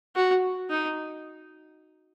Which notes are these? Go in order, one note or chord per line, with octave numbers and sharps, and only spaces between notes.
F#4
D#4